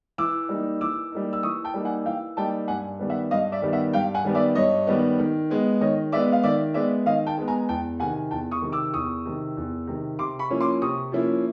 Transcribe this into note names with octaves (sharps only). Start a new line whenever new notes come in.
E3 D6 E6
G3 A#3 D#4
E3 D6 E6
G3 A#3 D#4
E6
E3 C#6 D#6
G5 A5
G3 A#3 D#4
F#5 G#5
E3 F5 G5
G3 A#3 D#4 G5 A5
G2 F#5 G#5
D#3 G3 B3
E5 F#5
G2 D#5 F5
D5 E5
D#3 G3 B3
E5 F#5
G2 F5 G5
F#5 G#5
D#3 G3 B3
D5 E5
G2 C#5 D#5
D#3 G3 B3
D#3
G#3 B3
D#3 C#5 D#5
G#3 B3 D5 E5
F5
D#3 D5 E5
G#3 B3 D5 E5
D#3 D#5 F5
G5 A5
G#3 B3
G#5 A#5
E2 G5 A5
C3 D#3 F#5 G#5
E2 G5 A5
C#6 D#6
C3 D#3
D6 E6
E2 C#6 D#6
C3 D#3
E2
C3 D#3
C3 C6 D6
B5 C#6
F3 A#3 C#4 E4
C6 D6
C3 C#6 D#6
F3 A#3 C#4 E4